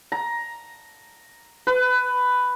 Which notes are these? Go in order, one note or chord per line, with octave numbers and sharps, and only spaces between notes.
A#5
B4